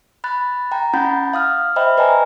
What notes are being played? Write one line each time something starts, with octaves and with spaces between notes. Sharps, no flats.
B5 F#6 A6
G5 A#5
C#4 E4 F#5 B5 G6 A6
F5 D#6 F6
C5 D#5 E5 G5 B5 F6
B4 D5 D#5 G5 G#5 A#5